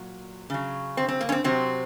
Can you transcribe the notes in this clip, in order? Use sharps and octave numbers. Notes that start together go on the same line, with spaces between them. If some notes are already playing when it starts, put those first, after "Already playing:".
Already playing: A#2 F#3
C#3 F#3
C4
C4
A#3
C#4
C4
C3 F#3 C4